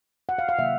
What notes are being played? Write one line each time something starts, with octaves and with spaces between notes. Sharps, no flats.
F#5
F5
F5
C3 D#3 F#3 A#3 E5